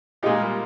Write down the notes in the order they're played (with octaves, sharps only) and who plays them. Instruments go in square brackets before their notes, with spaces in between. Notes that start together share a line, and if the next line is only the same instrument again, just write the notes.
[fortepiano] A#2 G#3 D#4 G4 [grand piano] F4 G#4
[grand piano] G3 A#3